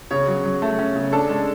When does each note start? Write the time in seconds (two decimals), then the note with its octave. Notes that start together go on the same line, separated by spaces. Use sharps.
0.11 C#3 C#5
0.28 F#3
0.44 F#3
0.62 A3
0.79 C#4
0.96 C#3
1.13 D4 A4
1.30 G#3